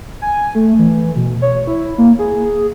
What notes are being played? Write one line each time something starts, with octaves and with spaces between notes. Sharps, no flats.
G#5
A3
E3
B2
C#5
E4
A#3
G#4